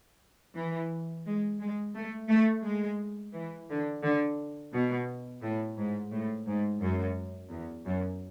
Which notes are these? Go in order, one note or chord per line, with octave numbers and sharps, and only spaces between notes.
E3
G#3
G#3
A3
A3
G#3
E3
D3
D3
B2
A2
G#2
A2
G#2
F#2
E2
F#2